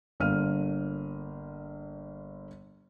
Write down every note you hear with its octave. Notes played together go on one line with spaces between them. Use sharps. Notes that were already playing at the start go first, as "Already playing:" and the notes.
G1 D3 A#3 F5 F6 D#7